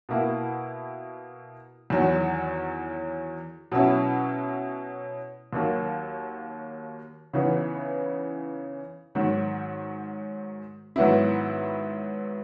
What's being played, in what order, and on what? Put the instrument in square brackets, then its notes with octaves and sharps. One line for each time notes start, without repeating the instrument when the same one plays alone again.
[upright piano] B2 A#3 E4
E2 D#3 F#3
B2 F#3 C#4 E4
D#2 D#3 F#3 A#3
C#3 E3 B3 D#4
G#2 D#3 F#3
G#2 D#3 F#3 B3 E4